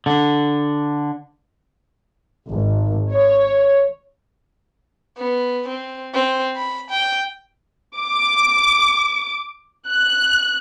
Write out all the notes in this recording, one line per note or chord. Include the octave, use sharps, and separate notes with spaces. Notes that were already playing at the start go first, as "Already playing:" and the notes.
D3
G#1
C#5
B3
C4
C4
B5
G5
D6
F#6